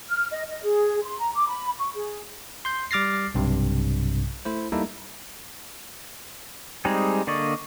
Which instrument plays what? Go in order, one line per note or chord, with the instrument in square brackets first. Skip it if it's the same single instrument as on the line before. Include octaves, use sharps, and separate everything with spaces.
[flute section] F6
D#5
D#5
G#4
C6
A#5
D6
B5
C#6
G#4
[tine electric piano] C6 G6
G3 D6 F6 A6 A#6 C7
B1 G2 C3
A3 E4 C5
G3 A#3 D#4 E4 A4
[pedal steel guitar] G3 G#3 C4 D#4 G#4
D3 A#3 D5 D#5 C#6